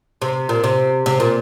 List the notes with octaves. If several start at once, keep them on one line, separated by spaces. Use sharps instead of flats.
C3
A#2
C3
C3
A#2